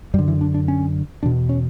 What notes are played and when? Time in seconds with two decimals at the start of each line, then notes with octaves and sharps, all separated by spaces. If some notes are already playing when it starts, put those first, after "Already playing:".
0.14 F#2 G3
0.19 D3
0.28 E3
0.41 D4
0.54 D4
0.68 C#4
1.23 E2 B2 D4
1.49 C#4